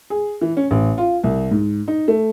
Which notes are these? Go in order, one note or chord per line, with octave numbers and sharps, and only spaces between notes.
G#4
E3
C#4
A1
F4
C2
G#2
D#4
A3